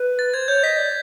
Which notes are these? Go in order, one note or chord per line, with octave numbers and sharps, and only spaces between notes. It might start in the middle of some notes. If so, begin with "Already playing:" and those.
Already playing: B4
A6
C5 G#6
C#5 G6
D#5 B6
D5